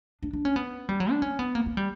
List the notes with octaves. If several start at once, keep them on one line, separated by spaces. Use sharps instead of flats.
D4
D4
C#4
B3
G3
F#3
D4
C#4
B3
A#3
A#3
G3